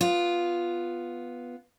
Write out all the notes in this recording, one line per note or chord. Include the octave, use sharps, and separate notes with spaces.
B3 F4